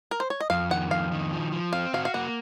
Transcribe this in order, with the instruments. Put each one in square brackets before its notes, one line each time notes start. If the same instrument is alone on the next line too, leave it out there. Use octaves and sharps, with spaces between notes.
[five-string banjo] A#4
C5
C#5
D#5
[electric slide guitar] F2 [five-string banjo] F5
[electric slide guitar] D#3 [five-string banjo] F#5
[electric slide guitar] F2 [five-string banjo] F5
[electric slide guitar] D#3
F3
F3
[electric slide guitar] C4 [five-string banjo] F5
[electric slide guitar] F#4 [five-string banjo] F5
[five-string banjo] F5
[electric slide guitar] A#3 [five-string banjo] F#5